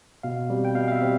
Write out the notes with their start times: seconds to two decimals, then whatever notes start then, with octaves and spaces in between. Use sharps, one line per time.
0.23 B2 F5
0.50 G3 C4
0.65 G5
0.75 B2 F5
0.88 F5
0.92 E5
1.01 G3 C4